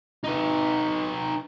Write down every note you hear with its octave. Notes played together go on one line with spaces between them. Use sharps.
D#4 B4